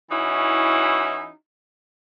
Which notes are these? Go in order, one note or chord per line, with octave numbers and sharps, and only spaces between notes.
E3 C#4 D#4 E4 F#4